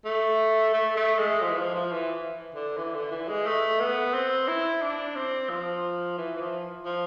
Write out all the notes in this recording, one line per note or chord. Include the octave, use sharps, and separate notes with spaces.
A3
A3
A3
G#3
F3
E3
F3
F3
E3
D3
E3
D3
E3
G#3
A3
B3
C4
E4
D4
C4
F3
E3
E3
F3
F3